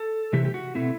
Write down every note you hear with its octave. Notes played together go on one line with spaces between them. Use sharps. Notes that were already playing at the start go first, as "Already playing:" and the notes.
Already playing: A4
C3 E3 A3 G4
G4
F#4
B2 A3 C4 E4